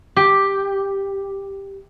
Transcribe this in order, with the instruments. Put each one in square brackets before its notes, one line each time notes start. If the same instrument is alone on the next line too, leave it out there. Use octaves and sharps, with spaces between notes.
[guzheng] G4